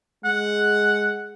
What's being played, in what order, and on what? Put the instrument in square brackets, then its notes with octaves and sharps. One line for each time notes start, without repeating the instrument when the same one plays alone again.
[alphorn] G#3 [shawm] F#5